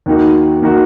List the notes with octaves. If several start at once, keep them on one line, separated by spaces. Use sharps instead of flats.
D#2 D#3 A#3 D#4 F#4
D#3 A#3 D#4 F#4